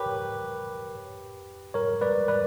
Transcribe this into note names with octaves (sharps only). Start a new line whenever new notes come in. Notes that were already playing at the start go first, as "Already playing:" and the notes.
Already playing: G4 A#4 B4 C#5
A#4 C#5
B4 D5
B4 D5